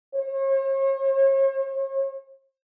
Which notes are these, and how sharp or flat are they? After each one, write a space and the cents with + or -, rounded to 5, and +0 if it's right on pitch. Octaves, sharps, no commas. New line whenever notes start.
C#5 -45